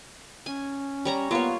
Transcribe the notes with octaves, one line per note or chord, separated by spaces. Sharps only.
C#4 G#5
G3 C#5 A#5
A#3 B3 F4 C#5